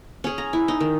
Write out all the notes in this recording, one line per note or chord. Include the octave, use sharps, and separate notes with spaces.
C#4 G#4
A#5
E4
D#4
D#3